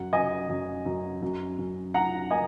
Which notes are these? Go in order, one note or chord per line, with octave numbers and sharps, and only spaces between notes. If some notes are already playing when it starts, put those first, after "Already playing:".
Already playing: F#2 F#5
F#2 D#5 G#5
F#2
F#2
F#2
F#2
F#2 F#5 A#5
A#3 D#5 G#5